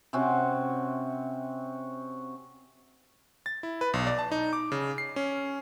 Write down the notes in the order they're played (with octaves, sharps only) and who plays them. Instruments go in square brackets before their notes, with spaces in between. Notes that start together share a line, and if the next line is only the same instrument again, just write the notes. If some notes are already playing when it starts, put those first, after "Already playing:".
[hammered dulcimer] C3 C4 C#4 F#4
[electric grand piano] A6
E4
B4
B1
D5
A5
D#4
D6
C#3
C7
C#4